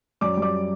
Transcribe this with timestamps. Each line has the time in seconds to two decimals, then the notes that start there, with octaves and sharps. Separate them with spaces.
0.21 F#2 D5 D6
0.37 G3
0.42 D5 D6